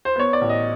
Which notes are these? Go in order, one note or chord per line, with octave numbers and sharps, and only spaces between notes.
C5
B3 C#5
D5
A1
D#5